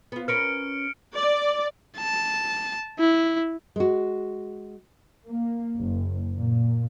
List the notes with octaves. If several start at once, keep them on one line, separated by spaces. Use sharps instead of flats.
B3 F4
C#4 A#4 B4 F6 C#7 D7
D5
A5
E4
G#3 F#4
A#3
F#1
A#2